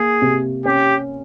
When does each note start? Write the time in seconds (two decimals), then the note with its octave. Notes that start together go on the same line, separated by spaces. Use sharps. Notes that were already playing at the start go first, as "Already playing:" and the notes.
Already playing: A#3 G#4
0.22 C3
0.65 C#4 G4